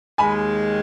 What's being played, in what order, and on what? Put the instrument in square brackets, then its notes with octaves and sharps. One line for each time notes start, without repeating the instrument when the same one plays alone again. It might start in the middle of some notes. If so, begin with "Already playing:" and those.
[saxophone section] D#2 D#3 G#3 [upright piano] G#5 B5